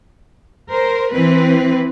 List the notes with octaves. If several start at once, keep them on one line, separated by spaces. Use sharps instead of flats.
A#4 C5
E3 C4 B4